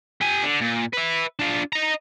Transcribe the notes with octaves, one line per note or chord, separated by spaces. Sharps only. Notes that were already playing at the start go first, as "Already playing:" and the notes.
G4 G#5
D3
A#2
B4 E5
D4 F4
D#5 A#5